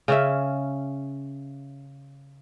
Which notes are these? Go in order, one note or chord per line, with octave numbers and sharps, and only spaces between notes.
C#3 C#4 E5